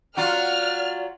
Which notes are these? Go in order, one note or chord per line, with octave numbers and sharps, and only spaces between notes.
F#3 F4 D5 F#5 F6